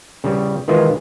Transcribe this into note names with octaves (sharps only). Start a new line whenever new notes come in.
C#3 G3
D#3 E3 G#3 F4